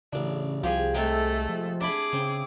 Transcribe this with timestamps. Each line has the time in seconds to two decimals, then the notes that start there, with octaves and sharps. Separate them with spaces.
0.13 A1 C#3 D4
0.63 C2 F3 G4 G#4 G#5
0.94 C3 G#3 A3 C4 A4 G5
1.49 F3
1.81 D4 E4 G#4 A5 B5 D6
2.13 C#3 C4